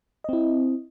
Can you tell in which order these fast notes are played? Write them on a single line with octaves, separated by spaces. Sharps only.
D#5 C4 E4